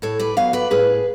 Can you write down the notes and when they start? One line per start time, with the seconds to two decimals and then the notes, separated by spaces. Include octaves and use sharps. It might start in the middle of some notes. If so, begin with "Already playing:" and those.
0.02 A2 A4 C#5
0.20 B4 D5
0.37 F#3 B3 C#5 F5
0.53 B4 D5
0.71 A2 G#4 B4